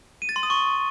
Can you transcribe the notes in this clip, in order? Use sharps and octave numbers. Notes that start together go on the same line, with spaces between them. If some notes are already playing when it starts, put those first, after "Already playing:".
D#7
A6
C6
D#6
C#6